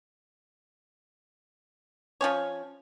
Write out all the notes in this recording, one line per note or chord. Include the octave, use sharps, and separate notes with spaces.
F3 C#4 C#5